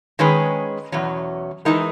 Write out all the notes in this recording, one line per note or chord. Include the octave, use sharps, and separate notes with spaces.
D#3 G#3 C#4 G#4 B4
E2 B2 F#3 C#4
E3 G#3 D#4 A#4